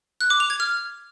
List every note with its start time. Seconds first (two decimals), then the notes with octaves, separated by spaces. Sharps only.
0.21 F#6
0.30 D6
0.40 F7
0.50 G#6
0.60 F6